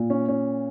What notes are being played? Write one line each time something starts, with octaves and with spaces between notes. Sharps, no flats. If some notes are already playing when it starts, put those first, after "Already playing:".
Already playing: A#2
C#4
C#4